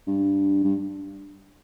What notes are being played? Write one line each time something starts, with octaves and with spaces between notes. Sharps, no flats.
G2
G2